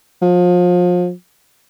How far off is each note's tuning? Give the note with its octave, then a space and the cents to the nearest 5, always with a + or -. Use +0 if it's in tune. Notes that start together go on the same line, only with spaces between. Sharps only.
F3 +30